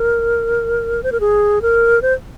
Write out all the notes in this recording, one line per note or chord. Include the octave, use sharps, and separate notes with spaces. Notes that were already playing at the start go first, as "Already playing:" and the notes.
Already playing: A#4
C5
A#4
G#4
A#4
C5